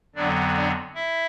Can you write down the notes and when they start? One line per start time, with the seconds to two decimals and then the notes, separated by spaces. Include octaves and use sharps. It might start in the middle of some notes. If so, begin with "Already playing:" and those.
0.15 F2 D3 F#3 B3 D4 D5
0.55 D4 D5
0.95 E4 E5